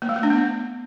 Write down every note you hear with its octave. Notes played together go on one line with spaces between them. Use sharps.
A#3
A3
A#3
D4
B3